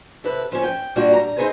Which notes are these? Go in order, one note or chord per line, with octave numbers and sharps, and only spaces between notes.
C3 A4 B4
F3 C#4
G5
A#2 G3 D4 F#4
A#5
C4 D#4 G#4 B4 C5